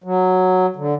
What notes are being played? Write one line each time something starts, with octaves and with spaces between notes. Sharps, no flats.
F#3
D3